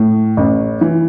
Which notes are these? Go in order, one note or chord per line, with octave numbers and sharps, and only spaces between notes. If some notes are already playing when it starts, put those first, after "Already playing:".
Already playing: A2
A1
E3